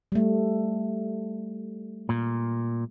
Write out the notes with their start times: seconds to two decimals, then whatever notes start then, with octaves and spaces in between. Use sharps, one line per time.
0.12 G3 A3
2.09 A#2